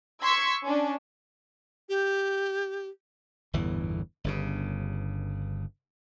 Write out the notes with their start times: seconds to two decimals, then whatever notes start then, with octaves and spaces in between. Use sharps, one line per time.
0.23 C6 C#6 E6 G#6 B6 C#7
0.65 C#4 D4
1.89 G4
3.53 G1 E2 A2 E3
4.24 G1 G2 C#3